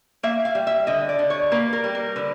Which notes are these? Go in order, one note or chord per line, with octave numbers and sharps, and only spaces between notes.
A#3 E5
F5
G3
E5
D3 D#5
D5
D3
C#5
A#3 B4
A#4
G3
A#4
D3 B4